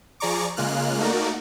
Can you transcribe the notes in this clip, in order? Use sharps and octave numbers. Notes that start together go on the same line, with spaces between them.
F3 G#4 D5 A#5 C#6 D6
C#3 G#3 A#3 F4 F6 F#6
A3 A#3 D#4 F#4 A#4 D5